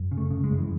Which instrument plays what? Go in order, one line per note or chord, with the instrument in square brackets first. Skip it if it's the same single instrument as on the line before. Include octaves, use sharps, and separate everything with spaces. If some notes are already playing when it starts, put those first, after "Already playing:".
Already playing: [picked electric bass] F#2
C#3
A3
C#3
G#3
F#2
E3